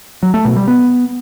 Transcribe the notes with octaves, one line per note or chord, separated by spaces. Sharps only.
F#3
A3
B2
G3
B3